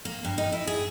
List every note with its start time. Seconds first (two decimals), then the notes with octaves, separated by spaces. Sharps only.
0.05 A#3
0.25 G2
0.38 D#4
0.52 E4
0.67 G#4